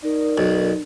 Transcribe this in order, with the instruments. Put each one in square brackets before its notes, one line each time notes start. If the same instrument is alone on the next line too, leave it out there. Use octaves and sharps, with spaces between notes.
[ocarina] D#4 [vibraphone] A#4 D5
[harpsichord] B1